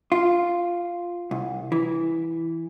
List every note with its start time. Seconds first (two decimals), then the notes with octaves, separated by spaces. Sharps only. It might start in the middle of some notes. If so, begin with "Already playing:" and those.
0.12 F4
1.31 C2
1.72 E3